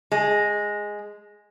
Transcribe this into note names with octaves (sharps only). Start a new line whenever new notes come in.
G#3